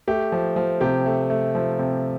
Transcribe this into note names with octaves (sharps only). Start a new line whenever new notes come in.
A3 G4
F3
F3
C3 G4
A3
A3
F3
C3